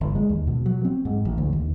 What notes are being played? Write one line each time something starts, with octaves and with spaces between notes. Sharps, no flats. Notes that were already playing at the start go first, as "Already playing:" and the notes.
G1
G#3
D#2
B2
F#3
C4
G#2
A1
D2
D#2